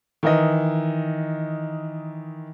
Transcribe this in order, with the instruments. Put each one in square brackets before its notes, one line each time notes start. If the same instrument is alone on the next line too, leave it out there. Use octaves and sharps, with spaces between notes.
[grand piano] D#3 E3 D#5